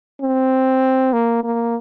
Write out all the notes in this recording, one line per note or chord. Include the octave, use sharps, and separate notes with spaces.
C4
A#3
A#3